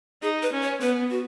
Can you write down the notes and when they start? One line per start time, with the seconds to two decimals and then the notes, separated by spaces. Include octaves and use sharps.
0.23 D#4 G#4
0.43 B4
0.52 C#4
0.62 C#5
0.81 B3 B4
1.11 F#4